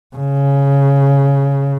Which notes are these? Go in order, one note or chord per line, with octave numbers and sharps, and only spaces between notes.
C#3